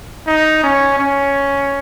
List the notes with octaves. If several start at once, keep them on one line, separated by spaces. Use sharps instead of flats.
D#4
C#4
C#4